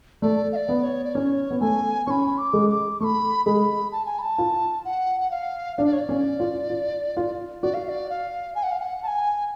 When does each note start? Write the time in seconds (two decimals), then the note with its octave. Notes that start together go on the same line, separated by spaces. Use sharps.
0.22 A3 D5
0.52 F5
0.56 D5
0.69 B3
0.83 C#5
1.05 D5
1.15 C#4 C#5
1.51 B3
1.60 A3 G#5
2.07 C#4 B5 C#6
2.38 D6
2.53 G#3
2.70 D6
3.00 A3 B5 C#6
3.46 G#3 B5
3.92 A5
4.06 G#5
4.19 B5
4.22 A5
4.38 F4
4.85 F#5
5.21 F#5
5.31 F5
5.77 D4 F5
5.85 D5
5.93 C#5
6.00 D5
6.09 C#4
6.40 F4
6.70 F4
7.17 F4
7.63 F#4 D5
7.74 F5
7.85 F5
7.89 D5
8.10 F5
8.55 G#5
8.63 F#5
8.71 F5
8.81 F#5
9.03 A5
9.07 G#5